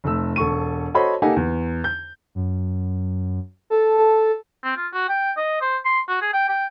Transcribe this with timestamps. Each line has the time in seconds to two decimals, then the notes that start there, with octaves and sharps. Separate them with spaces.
0.04 F1 A3 E6
0.36 E1 A4 C#6 D#7
0.95 F#4 A4 C5 C#5 D#5 B5
1.22 A#3 D#4 G4 A4 F#5 G#5
1.36 E2
1.84 G6
2.35 F#2
3.70 A4
3.97 A4
4.64 C4
4.77 F4
4.94 F#4
5.09 G5
5.37 D#5
5.61 C5
5.85 C6
6.09 F#4
6.22 G#4
6.34 G5
6.49 G5